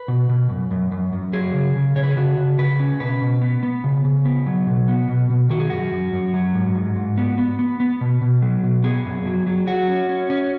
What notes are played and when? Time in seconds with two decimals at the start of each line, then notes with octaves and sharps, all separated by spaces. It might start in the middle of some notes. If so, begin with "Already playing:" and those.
Already playing: B4
0.08 B2
0.29 B2
0.50 F#2
0.71 F#2
0.92 F#2
1.13 F#2
1.33 F#3 G#4
1.54 C#3
1.76 C#3
1.96 C#3 C#5
2.03 B4
2.10 G#4
2.17 C#3 F#4
2.37 C#3
2.58 C#3 B4
2.80 C#4
3.00 B2 B4
3.21 B2
3.41 B3
3.63 B3
3.84 C#3
4.05 C#3
4.25 B3
4.46 F#3
4.67 B2
4.88 B3
5.09 B2
5.30 B2
5.50 D#3 F#4
5.59 G#4
5.70 F#2 F#4
5.92 F#2
6.13 F#2
6.34 F#3
6.55 G#2
6.75 G#2
6.96 G#2
7.17 B3
7.38 B3
7.59 B3
7.80 B3
8.01 B2
8.21 B2
8.42 F#3
8.63 B2
8.84 B3 G#4
9.05 F#2
9.26 F#3
9.47 F#3
9.67 F#3 F#4
9.88 C#4
10.09 C#4
10.30 C#4